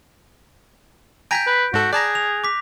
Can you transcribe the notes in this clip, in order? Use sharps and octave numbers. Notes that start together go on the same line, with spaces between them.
G5 G#5 A#5 G6 B6 D7
B4
G#2 F#4 A4
G#4 D5 A5 A#5 F#6 A#6
F7
D6 B6